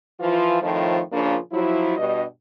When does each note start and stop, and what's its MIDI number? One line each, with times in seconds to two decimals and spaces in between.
0.20 0.59 52
0.20 0.59 53
0.20 0.59 65
0.61 1.01 41
0.61 1.01 45
0.61 1.01 51
0.61 1.01 53
1.11 1.36 46
1.11 1.36 49
1.11 1.36 53
1.11 1.36 58
1.11 1.36 62
1.52 1.95 53
1.52 1.95 54
1.52 1.95 64
1.97 2.22 43
1.97 2.22 47
1.97 2.22 75